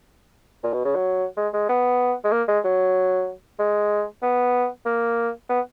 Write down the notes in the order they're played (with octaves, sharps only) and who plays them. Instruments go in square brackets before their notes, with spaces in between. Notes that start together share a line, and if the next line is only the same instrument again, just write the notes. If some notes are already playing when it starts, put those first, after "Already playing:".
[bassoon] A#2
B2
C#3
F#3
G#3
G#3
B3
G#3
A#3
G#3
F#3
G#3
B3
A#3
B3